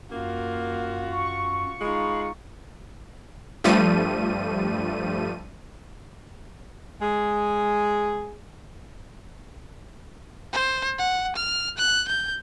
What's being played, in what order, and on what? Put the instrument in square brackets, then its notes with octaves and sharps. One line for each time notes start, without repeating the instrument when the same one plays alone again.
[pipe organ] F#2 [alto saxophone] A#3 [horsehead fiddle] F4 F#4
[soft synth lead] C#6
[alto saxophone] G#3 [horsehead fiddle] D#4 F4 [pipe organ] F5 B5
[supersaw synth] G2 F3 G3 A3 D#7
[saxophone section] G#3 G#4
[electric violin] C5
F#5
F6
F#6
G6